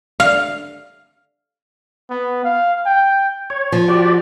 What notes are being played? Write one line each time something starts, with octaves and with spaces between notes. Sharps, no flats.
F5
B3
F5
G5
C#5
F3
F#4 G4 D5